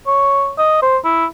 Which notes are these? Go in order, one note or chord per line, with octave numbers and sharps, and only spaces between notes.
C#5
D#5
C5
E4